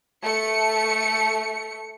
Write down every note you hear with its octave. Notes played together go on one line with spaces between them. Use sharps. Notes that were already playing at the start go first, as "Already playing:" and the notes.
A3 C#7